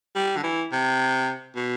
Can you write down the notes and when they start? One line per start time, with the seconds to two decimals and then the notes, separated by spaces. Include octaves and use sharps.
0.16 G3
0.37 D3
0.44 E3
0.72 C3
1.56 B2